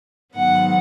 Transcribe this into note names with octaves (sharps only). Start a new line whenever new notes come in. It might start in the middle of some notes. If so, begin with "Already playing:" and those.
G#2 D#3 F#3 B3 F#5